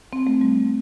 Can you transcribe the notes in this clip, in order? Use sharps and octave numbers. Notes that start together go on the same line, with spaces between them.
C4
A3
G3